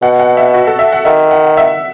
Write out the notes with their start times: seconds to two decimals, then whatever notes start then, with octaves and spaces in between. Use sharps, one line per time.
0.02 B2 F#5
0.19 F#5
0.37 E5
0.54 F#4
0.67 A4
0.79 E5
0.93 F#5
1.05 D#3 E5
1.31 F#5
1.57 E5